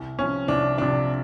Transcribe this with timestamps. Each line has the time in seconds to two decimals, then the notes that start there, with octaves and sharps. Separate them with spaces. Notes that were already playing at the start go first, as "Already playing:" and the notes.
Already playing: C2
0.19 C3 F3 C#4
0.48 C2 D4
0.78 C3 F3 D4